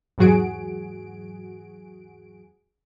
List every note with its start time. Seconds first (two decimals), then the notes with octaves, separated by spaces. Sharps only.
0.18 E2 G#2 F#3 F#4 G#4 D7